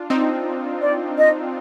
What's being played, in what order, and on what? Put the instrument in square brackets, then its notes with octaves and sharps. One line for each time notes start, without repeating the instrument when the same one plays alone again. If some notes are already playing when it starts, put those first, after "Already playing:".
Already playing: [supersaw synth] D4 F4
C4 D#4
[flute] D5
D#5